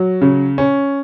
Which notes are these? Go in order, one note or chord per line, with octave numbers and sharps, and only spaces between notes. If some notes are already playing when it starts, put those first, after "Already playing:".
Already playing: F#3
C#3
C#4